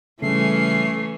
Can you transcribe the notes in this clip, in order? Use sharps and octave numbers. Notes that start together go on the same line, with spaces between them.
C#3 E3 G3 A3 C#4 C7